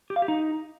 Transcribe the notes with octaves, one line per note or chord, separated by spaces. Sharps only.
G4
F5
G4
D#4